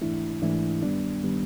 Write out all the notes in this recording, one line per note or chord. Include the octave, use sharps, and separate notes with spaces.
G#2 E3 A3 D4 E4
G#2 E3 A3 D4 E4
G2 D#3 G3 B3 D4
D#3 G3 B3